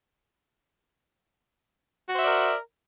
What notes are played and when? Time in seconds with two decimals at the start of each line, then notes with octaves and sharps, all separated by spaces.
2.08 F#4
2.13 C5
2.18 E5
2.23 D5
2.27 A#4